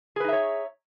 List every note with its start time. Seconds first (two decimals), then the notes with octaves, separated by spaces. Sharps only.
0.16 G#4
0.20 B4
0.24 D#4
0.28 E5
0.33 C#5